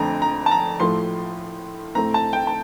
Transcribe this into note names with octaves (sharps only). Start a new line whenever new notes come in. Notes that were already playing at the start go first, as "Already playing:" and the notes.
Already playing: F2 D3 A3 C4 A5 A#5
A#5
A5
A#5
A2 F3 A3 C6
A2 A3 C4 A#5
A5
G5
A5